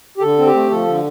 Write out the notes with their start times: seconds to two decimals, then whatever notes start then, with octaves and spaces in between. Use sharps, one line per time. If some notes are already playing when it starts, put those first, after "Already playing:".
0.18 G4
0.22 D3 A4
0.39 C4
0.46 G4
0.55 A3
0.70 F3 A4
0.87 D3